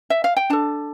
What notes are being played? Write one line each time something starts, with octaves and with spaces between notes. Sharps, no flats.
E5
F5
G5
D4 A4 A5